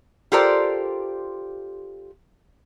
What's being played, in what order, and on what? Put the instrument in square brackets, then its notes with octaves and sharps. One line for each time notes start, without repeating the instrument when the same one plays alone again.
[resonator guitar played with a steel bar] F4 G4 A4 A#4 C5 D5